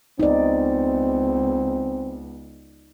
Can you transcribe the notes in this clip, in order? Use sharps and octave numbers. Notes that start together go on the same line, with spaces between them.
C#2 B3 C4 D#4 D5